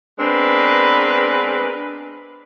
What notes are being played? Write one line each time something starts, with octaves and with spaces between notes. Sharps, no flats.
G#3 B3 C4 D4 A#4 B4